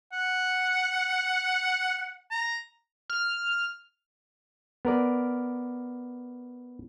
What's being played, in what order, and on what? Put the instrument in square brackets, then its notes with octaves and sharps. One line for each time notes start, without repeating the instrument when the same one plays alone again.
[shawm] F#5
A#5
[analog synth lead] F6
[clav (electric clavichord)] B3 A#4 D5